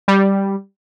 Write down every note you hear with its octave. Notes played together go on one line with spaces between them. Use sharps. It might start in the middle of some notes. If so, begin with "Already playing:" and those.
G3